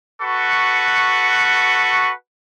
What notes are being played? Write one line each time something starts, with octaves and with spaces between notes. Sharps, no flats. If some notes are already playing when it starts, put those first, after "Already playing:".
F#4 A4 B4 C#6